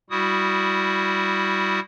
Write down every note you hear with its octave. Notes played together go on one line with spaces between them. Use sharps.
G3 E4 F#4 D#6